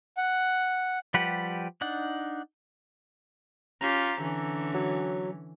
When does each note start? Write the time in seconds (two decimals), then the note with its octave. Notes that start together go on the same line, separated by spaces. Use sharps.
0.17 F#5
1.14 F3 G3 G4 B4 F#5
1.81 D4 D#4 F#5
3.81 C#4 F4 G4 A#5
4.20 D3 E3 C#4
4.74 F#3